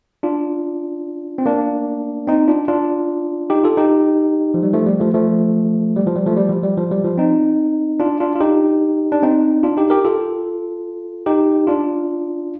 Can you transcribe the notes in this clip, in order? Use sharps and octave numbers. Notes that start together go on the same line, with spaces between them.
D4 F4
C4
A#3 D4
C4 D#4
D4 F4
D4 F4
D#4 G4
F4 A4
D#4 G4
F3
G3
F3 A3
G3
F3 A3
F3 A3
G3
F3
G3
F3 A3
G3
F3
G3
F3
G3
F3
C4 D#4
D4 F4
D4 F4
F4
D#4 G4
D4
C4 D#4
D4 F4
D#4 G4
G4 A#4
F4 A4
D#4 G4
D4 F4